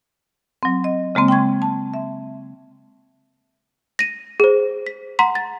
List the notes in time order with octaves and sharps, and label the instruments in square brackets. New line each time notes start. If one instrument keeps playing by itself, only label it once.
[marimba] F#3 C4
D#5
C#3 G#3 A#3 C4
G5 C6 C#6 G#6
A5
E5
[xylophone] A#6 D#7
G#4 C5
B6
F#5 A#5 C6 B6
A6